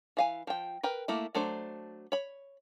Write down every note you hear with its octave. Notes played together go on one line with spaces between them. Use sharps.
E3 F5 G#5
F3 G5
A#4 B4 G5
A3 A#3 E4
F#3 A3 D4 C5
C#5 B5